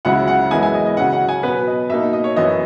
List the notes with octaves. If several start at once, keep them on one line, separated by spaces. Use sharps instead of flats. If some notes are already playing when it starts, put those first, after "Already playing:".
C#2 C#3 F#3 C#4 E4 F#5
F#5
F#2 E3 G#3 B3 E4 G#5
G#5
D#5
D#5
C#3 F#3 C#4 F#5
F#5
G#5
B2 F#3 B3 B4
D#5
B2 A#3 D#4 E5
D#5
C#5
F#2 E3 B3 D#5